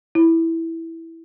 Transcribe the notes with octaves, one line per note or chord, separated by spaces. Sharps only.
E4